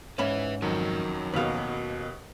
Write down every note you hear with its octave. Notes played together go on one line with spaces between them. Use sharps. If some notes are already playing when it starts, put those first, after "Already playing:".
G#2 C#4 B4 E5 B5
F2 D#3 F#3 F#4 A#4
D#2 B2 B4 F5